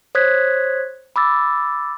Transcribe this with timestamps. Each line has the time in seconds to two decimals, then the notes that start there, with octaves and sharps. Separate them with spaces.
0.15 C5 C#5 D#6 F#6 G#6 B6
1.16 B5 D6 E6 A6